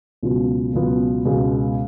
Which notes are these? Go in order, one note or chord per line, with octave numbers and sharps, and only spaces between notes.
C#2 B2 F#3 B3 F4
C#2 B2 F#3 B3 F4
C#2 B2 G#3 B3